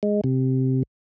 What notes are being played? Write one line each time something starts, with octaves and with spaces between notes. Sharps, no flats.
G#3
C3